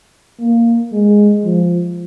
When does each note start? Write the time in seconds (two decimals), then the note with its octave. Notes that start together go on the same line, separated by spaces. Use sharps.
0.40 A#3
0.93 G#3
1.44 F3